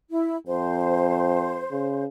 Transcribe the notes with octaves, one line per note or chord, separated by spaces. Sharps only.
E4
F2 C5
C#3